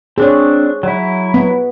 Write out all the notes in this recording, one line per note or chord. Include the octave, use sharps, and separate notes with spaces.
C4 D4 G#4 C#5
F#3 E4
B3